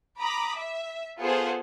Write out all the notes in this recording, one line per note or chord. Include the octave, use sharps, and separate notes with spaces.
A#5 B5 D6 D#6
E5
B3 F4 G#4 A4 C5 F#5